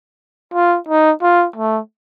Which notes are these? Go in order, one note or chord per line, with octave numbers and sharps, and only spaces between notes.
F4
D#4
F4
A3